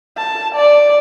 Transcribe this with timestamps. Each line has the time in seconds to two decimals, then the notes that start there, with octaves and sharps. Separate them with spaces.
0.18 A5
0.55 D5